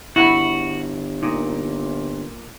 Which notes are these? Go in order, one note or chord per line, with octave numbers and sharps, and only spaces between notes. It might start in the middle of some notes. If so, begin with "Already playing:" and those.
G1 E4 F#4 F#5 B5
A#2 D#4